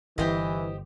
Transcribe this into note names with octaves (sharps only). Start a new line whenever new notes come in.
G1 E3 G4 C5 D#5